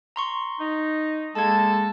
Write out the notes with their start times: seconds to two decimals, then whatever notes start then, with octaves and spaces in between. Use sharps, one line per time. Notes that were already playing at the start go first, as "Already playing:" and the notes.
0.16 A#5 C6 C#6
0.59 D#4
1.35 G#3 A#3 A4 A5 G#6